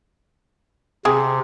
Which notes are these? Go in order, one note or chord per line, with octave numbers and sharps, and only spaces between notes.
C3 C4 G#4